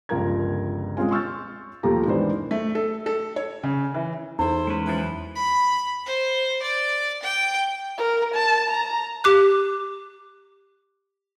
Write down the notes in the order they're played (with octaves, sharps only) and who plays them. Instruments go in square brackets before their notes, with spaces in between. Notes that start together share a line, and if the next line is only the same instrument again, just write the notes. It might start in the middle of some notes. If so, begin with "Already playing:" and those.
[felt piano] G1 C#2 F3 A#4 A#5 G#6
G#3 C4 C#4 F4 G#5
C6 C#6 E6 F6 G6 A6
D#2 B2 F3 A3 G4 A#5
G#2 D#3 E3 B3 D4 C5
A3
A4
A4
C#5
C#3
E3
[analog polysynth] E2 [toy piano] D#4 [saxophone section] E4 A4 C5
[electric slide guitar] G#3 C#4 B4
[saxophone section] F#2 E3 F3
[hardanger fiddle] B5
C5
D5
G5
[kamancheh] A#4
A5
A#5
[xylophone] G4 D6 F#6